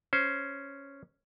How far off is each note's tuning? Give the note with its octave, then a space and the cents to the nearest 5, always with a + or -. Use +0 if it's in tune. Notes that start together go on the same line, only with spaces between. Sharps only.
C#4 +0 C5 -5